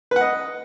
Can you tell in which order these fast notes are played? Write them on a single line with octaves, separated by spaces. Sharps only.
B4 F#5 D#5